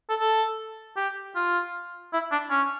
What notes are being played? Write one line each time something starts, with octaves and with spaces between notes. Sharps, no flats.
A4
A4
G4
F4
E4
D4
C#4